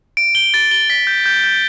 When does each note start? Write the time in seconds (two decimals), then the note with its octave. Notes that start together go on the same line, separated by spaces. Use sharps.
0.17 D7
0.35 G7
0.54 A6
0.71 G7
0.90 B6
1.07 G6
1.26 G6
1.44 G6